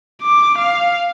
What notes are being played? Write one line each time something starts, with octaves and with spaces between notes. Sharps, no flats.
D6
F5